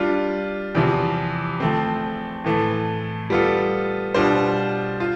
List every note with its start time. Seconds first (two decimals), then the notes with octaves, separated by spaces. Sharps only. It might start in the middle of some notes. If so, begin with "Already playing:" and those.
Already playing: G3 D4 F4
0.75 E2 C3 F3
1.60 F3 A3 C4
2.44 A2 E3 A3
3.30 G3 B3 F4 A4
4.14 B2 G3 D4 F4 C5
5.00 F4